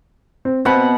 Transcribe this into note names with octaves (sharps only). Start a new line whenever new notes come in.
C4
B2 C4 F#5 B5